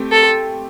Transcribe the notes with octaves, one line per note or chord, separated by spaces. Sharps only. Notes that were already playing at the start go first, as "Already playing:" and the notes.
Already playing: A3 C4 G4
A4